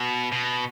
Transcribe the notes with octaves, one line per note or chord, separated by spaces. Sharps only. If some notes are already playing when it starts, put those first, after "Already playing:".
Already playing: B2
B2